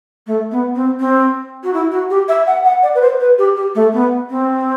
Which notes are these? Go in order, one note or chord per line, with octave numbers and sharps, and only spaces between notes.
A3
B3
C4
C4
F#4
E4
F#4
G4
E5
F#5
F#5
D5
B4
C5
B4
G4
G4
A3
B3
C4